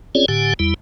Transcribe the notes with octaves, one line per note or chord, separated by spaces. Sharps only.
C4 C#4 F4 G#4 C#5 D5
A2 D3 G4 F#5 G#5
E2 G3 E4